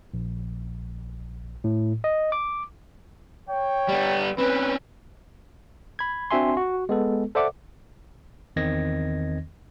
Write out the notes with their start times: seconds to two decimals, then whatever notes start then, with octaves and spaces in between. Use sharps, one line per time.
0.14 A#1
1.64 A2
2.04 D#5
2.32 D6
3.50 C#5 G5
3.88 G3 B3
4.38 C4 C#4 B4
5.99 B5 G#6
6.31 C4 D4 F#4 E5 G#5 C6
6.57 F#4
6.89 G#3 B3 A4
7.35 A4 C5 D5 E5 F#5 D6
8.56 E2 D#3 C4 D#5 G#6 A#6